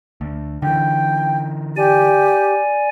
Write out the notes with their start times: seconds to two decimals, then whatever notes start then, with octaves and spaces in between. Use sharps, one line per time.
0.21 D2
0.62 D3 E3 G5
1.76 G4 D5 G#5